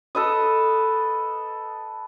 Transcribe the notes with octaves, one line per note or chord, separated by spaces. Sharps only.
A4 B4 D#5